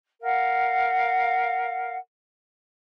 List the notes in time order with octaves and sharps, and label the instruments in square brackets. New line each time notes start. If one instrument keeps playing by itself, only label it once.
[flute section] A#4 F5 F#5